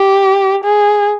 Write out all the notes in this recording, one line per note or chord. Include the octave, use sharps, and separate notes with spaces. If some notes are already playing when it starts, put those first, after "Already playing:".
Already playing: G4
G#4